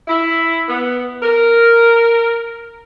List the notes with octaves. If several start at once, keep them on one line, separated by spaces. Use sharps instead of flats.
E4
B3
A#4